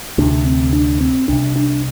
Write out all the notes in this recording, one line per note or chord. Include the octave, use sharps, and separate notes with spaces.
D2 C3 D4
C4
D4
C4
C2 C3 D4
D4